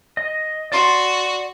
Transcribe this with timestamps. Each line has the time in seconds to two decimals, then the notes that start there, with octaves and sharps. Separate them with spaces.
0.17 D#5
0.72 F#4 D5 C6